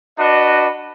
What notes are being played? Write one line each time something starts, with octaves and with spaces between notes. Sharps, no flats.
D4 F#4 B4 D#5